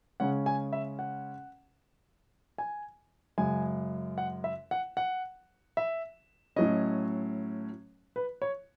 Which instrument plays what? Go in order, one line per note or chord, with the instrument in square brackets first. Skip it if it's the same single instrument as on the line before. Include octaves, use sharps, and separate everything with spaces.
[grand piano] C#3 G#3 C#4 F#5
G#5
E5
F#5
G#5
F#2 C#3 G#3 G#5
F#5
E5
F#5
F#5
E5
A2 F#3 C#4 D#5
B4
C#5